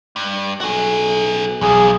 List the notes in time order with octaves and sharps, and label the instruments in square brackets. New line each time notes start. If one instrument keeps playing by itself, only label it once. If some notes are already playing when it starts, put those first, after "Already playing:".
[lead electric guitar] G2
[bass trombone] B1 [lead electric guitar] F#4 G#4
[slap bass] B1 [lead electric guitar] E2 F3 [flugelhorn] G#4